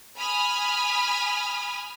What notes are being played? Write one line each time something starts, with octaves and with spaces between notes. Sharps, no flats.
G#5 B5 D#6 F6